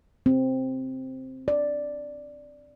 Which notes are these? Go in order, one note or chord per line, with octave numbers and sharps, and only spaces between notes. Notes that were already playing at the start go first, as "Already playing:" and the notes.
C4
D5